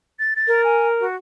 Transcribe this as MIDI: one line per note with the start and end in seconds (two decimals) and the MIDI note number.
0.19 0.34 93
0.36 0.61 93
0.47 1.04 70
0.64 0.87 80
1.00 1.15 66